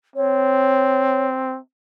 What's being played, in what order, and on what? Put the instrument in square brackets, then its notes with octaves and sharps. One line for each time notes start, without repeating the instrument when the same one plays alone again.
[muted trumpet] C4 [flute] C#5